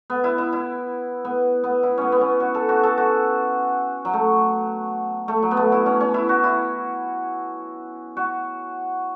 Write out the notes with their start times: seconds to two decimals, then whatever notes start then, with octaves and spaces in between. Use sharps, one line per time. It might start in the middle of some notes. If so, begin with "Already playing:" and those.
0.10 B3
0.24 E4
0.38 E4
0.53 E4
1.25 B3
1.64 B3
1.83 E4
1.98 B3 C#4
2.12 B3
2.21 C#4
2.40 F#4
2.54 A4
2.69 F#4
2.83 A4
2.98 F#4
4.05 F#3
4.13 A3
5.28 A3
5.43 F#3
5.51 B3
5.57 A3
5.72 E4
5.86 C#4
6.00 C#4
6.14 E4
6.29 F#4
6.44 E4
8.17 F#4